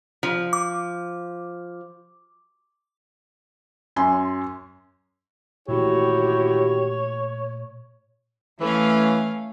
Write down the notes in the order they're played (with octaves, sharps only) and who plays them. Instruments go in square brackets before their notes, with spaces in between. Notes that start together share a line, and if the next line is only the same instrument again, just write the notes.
[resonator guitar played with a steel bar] F3
[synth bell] D6
[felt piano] F#2 G#5 C6
[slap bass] A#2 E3 A3 [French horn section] D#3 F#4 G4 [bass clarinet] E4 [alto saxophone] C#5
[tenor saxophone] E3 [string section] A3 C#4 F5